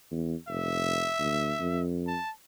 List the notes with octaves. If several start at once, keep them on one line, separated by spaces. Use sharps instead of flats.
E2
F1 E5
D2
F2
A5